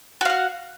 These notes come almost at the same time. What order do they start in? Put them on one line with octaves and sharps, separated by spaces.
F#4 F5 F#5